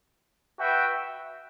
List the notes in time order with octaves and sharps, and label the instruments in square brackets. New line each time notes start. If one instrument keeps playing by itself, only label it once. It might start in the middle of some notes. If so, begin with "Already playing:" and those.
[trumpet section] F#4 B4 E5 G5